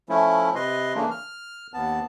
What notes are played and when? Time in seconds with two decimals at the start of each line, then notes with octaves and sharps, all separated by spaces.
0.09 F3 A3 C#4 E4
0.55 C3 B4 D#5 C6
0.95 C#3 E3 A3 A#3 D4
1.11 F6
1.74 D#2 B3 A5